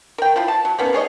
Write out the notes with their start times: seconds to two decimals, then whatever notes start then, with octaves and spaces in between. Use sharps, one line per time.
0.18 A#4 G5
0.36 F3 E4 F4
0.48 A5
0.65 F#3
0.79 A#3 B3 C#4 D#4
0.93 C3 G#4 C#5 D#5